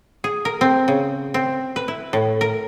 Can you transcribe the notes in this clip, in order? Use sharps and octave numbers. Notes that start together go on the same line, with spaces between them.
G#4
A#4
C4
C#3
C4
B4
E4
A2
A#4